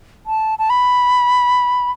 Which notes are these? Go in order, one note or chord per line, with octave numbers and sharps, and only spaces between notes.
A5
A5
B5